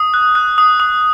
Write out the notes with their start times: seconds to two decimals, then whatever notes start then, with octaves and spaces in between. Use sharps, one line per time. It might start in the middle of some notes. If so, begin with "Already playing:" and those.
Already playing: D#6
0.14 F#6
0.35 F#6
0.58 D#6
0.80 D#6